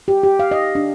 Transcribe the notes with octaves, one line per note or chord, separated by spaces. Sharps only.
G4
G4
F5
D#5
D4